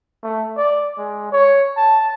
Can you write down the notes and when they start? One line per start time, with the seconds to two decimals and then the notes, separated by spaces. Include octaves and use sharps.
0.23 A3
0.57 D5
0.98 G#3
1.32 C#5
1.77 A5